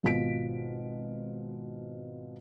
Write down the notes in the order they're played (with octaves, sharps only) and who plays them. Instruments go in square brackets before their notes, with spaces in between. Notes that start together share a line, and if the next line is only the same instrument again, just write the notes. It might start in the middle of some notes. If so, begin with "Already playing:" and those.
[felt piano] G#1 B2 F4 B6 D7